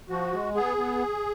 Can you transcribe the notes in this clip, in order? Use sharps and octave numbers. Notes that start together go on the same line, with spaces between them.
F3 F#4
G#3
B3 G#4
B3